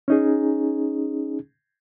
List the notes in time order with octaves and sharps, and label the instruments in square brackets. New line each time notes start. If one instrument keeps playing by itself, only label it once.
[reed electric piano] C#4 D#4 G#4